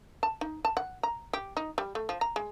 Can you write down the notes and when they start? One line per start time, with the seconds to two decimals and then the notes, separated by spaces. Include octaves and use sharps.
0.23 A5
0.41 D#4
0.65 A5
0.77 F#5
1.03 A#5
1.33 G4
1.57 D#4
1.78 G3
1.95 A3
2.09 F3
2.21 A#5
2.36 G#3